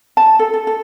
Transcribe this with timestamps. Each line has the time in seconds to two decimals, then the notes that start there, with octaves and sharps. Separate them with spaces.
0.17 A5
0.39 A4
0.54 A4
0.67 A4